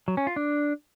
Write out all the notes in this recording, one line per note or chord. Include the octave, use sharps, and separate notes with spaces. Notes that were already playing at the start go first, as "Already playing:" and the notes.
F#3
C#4
F4
D4